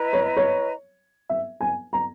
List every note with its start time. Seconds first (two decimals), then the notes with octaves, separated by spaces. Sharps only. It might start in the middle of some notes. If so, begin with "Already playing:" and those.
Already playing: E4 B4 D#5 A#5
0.13 C#5
0.37 C#5
1.29 E5
1.61 G#5
1.93 A#5